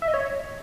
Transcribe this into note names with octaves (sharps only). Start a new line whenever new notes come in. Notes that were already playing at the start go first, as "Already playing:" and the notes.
E5
D#5
C#5